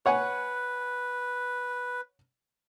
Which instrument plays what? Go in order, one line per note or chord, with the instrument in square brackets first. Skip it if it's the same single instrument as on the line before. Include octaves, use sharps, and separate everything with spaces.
[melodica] B4 [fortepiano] C#5 F#5 G#5